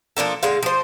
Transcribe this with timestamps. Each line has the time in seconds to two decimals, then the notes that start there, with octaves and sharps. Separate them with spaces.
0.17 F3 A#3 D4 A4
0.43 D3 G#3 F5
0.63 F3 C5